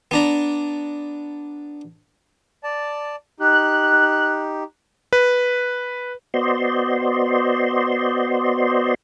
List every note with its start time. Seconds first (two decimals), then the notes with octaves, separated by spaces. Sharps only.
0.11 B3 D4 A#5
2.63 D5 A5
3.40 D#4 G4 F#6
5.13 B4
6.34 B3 F#4 C5 D5 D#5 C6